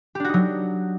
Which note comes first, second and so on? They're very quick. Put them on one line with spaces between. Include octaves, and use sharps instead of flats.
G4 D4 F#4 D#4 F#3